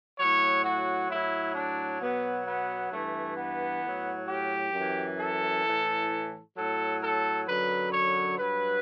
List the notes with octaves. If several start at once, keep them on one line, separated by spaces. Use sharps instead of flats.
A2 F#3 C#5
F#4
A2 F#3 E4
D4
B2 F#3 B3
B3
G2 E3 A3
B3
A2 F#3
G4
F#2 E3
A4
A2 E3
A2 F#3 A4
A4
F#2 D3 F#3 B4
C#5
G2 F#3 B4